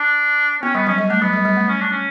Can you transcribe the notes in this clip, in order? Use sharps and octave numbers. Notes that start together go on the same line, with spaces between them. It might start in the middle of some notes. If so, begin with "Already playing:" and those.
Already playing: D4
B3 C#4
G3 B3
F#3 C#4
G3
A3 D4
F#3 B3
G3
G3
A3
C#4
D4
C#4